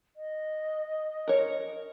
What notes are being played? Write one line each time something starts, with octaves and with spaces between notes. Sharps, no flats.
D#5
A#4 C#5